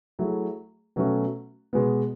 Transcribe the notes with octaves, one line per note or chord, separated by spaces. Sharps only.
F#3 A3 E4 G#4
B2 F#3 A3 C#4 F#4
B2 G#3 B3